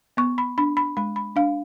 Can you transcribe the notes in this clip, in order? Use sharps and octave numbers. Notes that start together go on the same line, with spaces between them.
B3 C#6
B5
D4 B5
B5
G#3 B5
B5
D4 F5